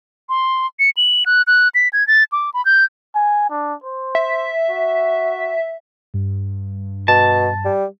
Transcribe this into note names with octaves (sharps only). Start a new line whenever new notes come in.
C6
C#7
F#7
F#6
F#6
B6
G#6
A6
D6
B5
G6
G#5
D4
C5
E5
F#4
G2
B2 A5
G3